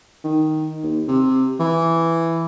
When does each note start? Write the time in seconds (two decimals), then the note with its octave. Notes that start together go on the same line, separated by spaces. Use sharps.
0.24 D#3
0.83 D#2
1.08 C3
1.60 E3